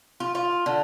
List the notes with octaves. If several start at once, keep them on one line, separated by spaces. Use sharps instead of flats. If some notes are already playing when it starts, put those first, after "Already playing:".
F4
F4
D3